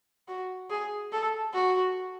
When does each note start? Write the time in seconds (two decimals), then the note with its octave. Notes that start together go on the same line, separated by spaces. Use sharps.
0.28 F#4
0.70 G#4
1.13 A4
1.54 F#4